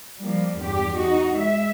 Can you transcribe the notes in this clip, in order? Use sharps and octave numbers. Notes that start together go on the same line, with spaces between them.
F3 G3 A#3
E2 G2 G4
D#4 F#4
G#3 E5